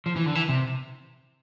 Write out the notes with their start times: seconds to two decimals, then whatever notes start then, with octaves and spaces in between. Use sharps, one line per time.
0.06 F3
0.16 E3
0.26 D3
0.35 E3
0.49 C3